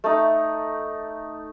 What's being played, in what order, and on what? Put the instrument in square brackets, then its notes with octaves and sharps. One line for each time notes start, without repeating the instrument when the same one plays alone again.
[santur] A3 D#4